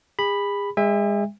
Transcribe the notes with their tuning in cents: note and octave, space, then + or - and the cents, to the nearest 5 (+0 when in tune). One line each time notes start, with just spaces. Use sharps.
G#4 -40 B5 +0
G#3 -30 E5 +0 G#5 -45